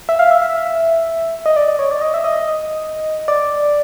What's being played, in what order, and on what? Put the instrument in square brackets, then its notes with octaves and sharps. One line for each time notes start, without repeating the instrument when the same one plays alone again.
[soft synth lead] E5
F5
E5
E5
D#5
D5
D5
C#5
D5
D#5
E5
D#5
D5